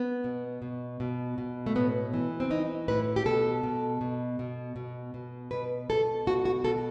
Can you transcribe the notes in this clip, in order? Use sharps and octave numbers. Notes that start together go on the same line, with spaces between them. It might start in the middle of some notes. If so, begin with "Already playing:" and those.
Already playing: B3
B2
B2
B2
B2
A3
A2 B3
E3
C4
E3 D#4
A2 B4
G4
B2 A4
B2
B2
B2
B2
B2
B2 B4
B2 A4
B2 F#4
F#4
B2 A4